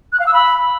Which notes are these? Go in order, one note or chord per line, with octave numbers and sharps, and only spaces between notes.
F#6
F5
E6
B5